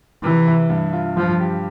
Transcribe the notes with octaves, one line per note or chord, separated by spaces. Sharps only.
C3 E3
E4
G2
F4
G2 F3
G4